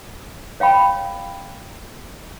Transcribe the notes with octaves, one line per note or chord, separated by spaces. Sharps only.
C#5 F5 G5 B5